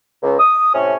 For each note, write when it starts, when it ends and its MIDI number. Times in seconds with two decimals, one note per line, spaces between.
0.23 0.37 37
0.40 0.73 87
0.75 0.95 45
0.75 0.95 48
0.75 0.95 61